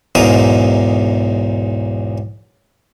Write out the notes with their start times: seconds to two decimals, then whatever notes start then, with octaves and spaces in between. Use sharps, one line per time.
0.15 B1 E2 G#2 E3 A#4 D#6